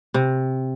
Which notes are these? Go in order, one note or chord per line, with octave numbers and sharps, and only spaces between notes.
C3